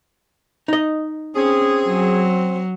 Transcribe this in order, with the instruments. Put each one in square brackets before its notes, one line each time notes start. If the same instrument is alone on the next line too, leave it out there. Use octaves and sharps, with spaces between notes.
[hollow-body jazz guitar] D#4 D#5
[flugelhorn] C4 [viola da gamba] C#4 [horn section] G#4
[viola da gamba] F#3